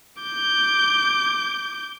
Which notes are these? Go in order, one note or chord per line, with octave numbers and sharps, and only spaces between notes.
D6 G6